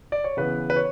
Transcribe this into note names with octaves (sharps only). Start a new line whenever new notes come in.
D5
C#5
C#3 E3 B3 B4
B4
C#5